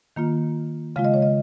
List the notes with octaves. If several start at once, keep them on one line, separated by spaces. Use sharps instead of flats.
D#3 A#3 F4
C#3 G#3 F4 F5
D#5
C#5
D#5